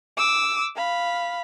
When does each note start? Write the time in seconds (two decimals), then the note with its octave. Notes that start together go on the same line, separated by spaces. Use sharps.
0.17 D6 E6
0.76 F5 B5